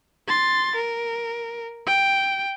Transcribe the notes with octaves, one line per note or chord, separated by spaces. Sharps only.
C6 A6
A#4
G5